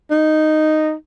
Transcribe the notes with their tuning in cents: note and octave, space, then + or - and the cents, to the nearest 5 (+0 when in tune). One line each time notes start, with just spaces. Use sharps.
D#4 -5